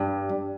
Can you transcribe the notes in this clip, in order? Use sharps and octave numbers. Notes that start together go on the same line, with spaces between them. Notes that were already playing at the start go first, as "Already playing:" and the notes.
Already playing: G2